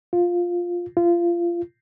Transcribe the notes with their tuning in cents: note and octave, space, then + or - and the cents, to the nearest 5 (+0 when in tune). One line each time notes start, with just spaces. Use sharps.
F4 +5
F4 -25